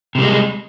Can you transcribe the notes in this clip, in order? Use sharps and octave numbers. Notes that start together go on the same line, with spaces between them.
C3 G3 G#3